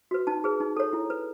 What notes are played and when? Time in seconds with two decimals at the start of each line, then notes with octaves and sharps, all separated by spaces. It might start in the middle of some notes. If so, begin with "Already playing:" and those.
0.11 F#4 B4
0.27 D#4 A5
0.44 G#4 B4
0.60 D#4
0.77 A4 C#5
0.93 E4
1.10 B4